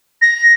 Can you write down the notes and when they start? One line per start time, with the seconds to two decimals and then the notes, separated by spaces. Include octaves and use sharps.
0.22 A#6